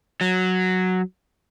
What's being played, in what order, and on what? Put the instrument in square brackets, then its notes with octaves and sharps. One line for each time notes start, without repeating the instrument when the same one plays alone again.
[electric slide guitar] F#3